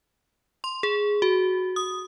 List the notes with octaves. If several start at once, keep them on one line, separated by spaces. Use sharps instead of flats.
C6
G#4
F#4
D#6